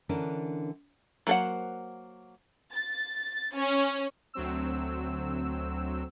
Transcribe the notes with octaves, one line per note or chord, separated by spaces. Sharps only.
D3 E3 C#4 D4 A#4
F#3 A#3 A4 C5 F#5
A6
C#4
D2 F#3 C4 E6